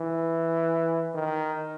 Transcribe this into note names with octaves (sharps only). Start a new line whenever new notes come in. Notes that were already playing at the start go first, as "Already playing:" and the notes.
Already playing: E3
D#3